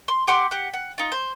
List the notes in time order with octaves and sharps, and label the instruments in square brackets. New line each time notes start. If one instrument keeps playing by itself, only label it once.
[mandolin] C6
G4 F#5 C6 D6
G4 F#5
F#5
D#4 F4
C5